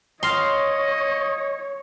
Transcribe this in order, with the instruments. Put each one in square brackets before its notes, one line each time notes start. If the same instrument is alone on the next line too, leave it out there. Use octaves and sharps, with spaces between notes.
[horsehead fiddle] C#5 [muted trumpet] D#5 [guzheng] F5 C6